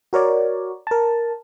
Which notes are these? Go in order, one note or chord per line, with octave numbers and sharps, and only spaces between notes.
F#4 A#4 C#5 D5
A#4 A5